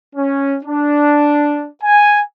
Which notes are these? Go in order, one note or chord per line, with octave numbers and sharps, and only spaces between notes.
C#4
D4
G#5